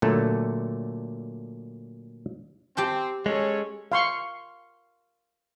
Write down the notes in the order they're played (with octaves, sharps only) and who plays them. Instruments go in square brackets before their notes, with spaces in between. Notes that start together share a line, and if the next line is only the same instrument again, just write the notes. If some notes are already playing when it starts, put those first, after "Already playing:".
[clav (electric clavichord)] A#2 D3 F#3 A3 A4
[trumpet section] C4 [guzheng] G4 G5 A5
[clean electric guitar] G#3 [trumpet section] C#4 A4 C#5
[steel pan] F5 C6 C#6